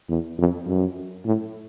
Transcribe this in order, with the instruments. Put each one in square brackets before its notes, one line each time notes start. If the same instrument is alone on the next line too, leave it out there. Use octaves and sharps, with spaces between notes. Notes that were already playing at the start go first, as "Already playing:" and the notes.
[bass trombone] E2
F2
F#2
A2